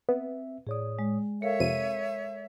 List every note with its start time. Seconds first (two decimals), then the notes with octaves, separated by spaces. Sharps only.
0.09 B3 C4 E5
0.67 A2 G#4 C#5 D5 D#6
0.99 G#3
1.42 A4 A#4 C#5 E5 F5 C#7
1.60 F2 C3 D#7